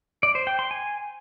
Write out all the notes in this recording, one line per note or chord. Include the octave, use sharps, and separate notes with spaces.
D5
C5
G5
C6
G#5